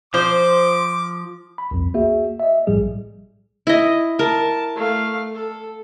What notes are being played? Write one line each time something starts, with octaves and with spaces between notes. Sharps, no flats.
F3 C5 D6
B5
C2 F2
A#3 F#4 G#4 E5
D#5 E5
A#1 A2 F3 G3 G#4
E4 D#5
A#4 A5
A3 F5
A4